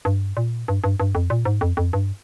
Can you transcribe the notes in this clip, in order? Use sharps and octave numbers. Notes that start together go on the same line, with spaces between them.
G2
A#2
G2
G2
G2
F2
A#2
G#2
F2
F2
G2